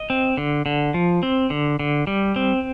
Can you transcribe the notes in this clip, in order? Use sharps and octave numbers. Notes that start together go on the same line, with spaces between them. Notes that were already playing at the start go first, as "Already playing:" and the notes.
Already playing: D#5
C4
D3
D3
F3
C4
D3
D3
G3
C4